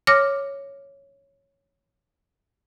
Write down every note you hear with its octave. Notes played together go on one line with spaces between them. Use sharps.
C#5 D6 F6 A#6